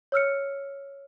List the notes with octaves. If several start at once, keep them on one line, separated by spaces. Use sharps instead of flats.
C#5 E6 F6 C#7